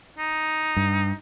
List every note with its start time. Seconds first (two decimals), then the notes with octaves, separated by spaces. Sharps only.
0.18 D#4
0.76 G2